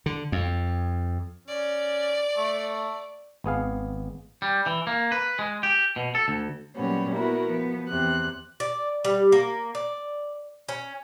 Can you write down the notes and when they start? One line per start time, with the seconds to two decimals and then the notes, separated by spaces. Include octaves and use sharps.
0.06 D3
0.32 F2
1.48 C#4 D5
2.37 A3
3.44 G#1 B3 G#4 F5
4.42 G3
4.66 E3
4.87 A#3
5.12 B4
5.39 G#3
5.63 G4
5.96 B2
6.15 A4
6.28 D2
6.75 A#2 F#3 G3 B3 C#4
7.14 B3 E4 F#4 A#4
7.47 F3 B3
7.89 E2 C3 F#6
8.60 D5
9.04 G3
9.32 A#3
9.75 D5
10.69 C#4